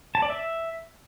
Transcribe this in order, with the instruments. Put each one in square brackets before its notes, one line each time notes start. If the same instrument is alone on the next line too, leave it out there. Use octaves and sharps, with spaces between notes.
[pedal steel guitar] A5
D5
E5